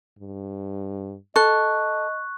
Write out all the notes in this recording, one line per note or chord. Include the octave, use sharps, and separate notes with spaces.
G2
A4 D#5 C#6 F#6